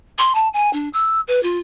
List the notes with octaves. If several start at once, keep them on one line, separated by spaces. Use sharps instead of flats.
C6
A5
G#5
D4
E6
B4
F4